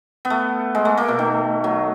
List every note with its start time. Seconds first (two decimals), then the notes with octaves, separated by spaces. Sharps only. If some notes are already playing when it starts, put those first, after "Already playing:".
0.25 B3
0.30 A3
0.75 G#3
0.85 A3
0.97 A3
1.08 B2
1.19 D#3
1.64 F#3